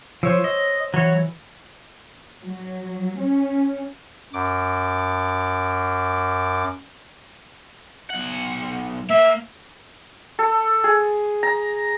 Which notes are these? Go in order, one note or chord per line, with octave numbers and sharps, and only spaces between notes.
F3 C5 C#5 E6
D#5
E3 F#3 C#5
F#3
C#4
F#2 D6
B1 F#5
A#3 E5
A4
G#4
A#5